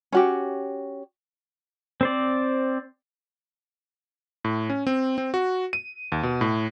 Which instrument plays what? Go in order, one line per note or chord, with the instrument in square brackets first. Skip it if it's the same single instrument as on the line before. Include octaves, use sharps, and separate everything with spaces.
[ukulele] C#4 F#4 G4
[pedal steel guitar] C4 C5 D5
[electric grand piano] A2
C#4
C4
C4
F#4
D#7
D#2
B2
A2